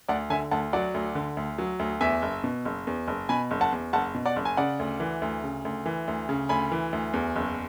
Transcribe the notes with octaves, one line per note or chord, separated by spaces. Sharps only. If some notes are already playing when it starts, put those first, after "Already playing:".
D2 D5 F#5
D3 E5 G#5
D2 F#5 A5
F#3 D5 F#5
D2
D3
D2
F#3
D2
E2 E5 G#5
F#1
B2
F#1
E2
F#1
B2 G#5 B5
F#1
F#5 A5
E2
F#1 F#5 A5
B2
D5 F#5
F#1
G#5
C#3 D5 F#5
D2
E3
D2
C#3
D2
E3
D2
C#3
D2 G#5 B5
E3
D2
E2
F#1